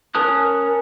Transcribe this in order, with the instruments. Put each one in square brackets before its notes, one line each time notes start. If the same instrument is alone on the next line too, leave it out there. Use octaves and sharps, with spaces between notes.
[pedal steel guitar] C#4 A#4 A5 D#6 F#6